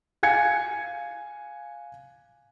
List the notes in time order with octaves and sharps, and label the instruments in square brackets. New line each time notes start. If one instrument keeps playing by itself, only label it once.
[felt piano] F5 G#5 G#6 C#7